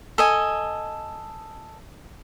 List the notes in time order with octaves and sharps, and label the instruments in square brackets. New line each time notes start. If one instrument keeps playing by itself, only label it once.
[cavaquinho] A4 D#5 G#5